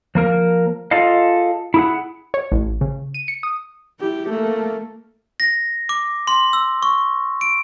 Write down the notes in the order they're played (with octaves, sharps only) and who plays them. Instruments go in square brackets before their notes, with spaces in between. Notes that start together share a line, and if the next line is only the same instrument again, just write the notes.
[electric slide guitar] F3 A#3 A#4
F4 G#4 A4 D#5 F5
E4 G#4 F#5
[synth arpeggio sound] C#5
A1
C#3
D#7
C#7
D#6
[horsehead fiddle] E4 G4
A3 A#3
[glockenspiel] A#6
D6
C6
E6
C#6
D7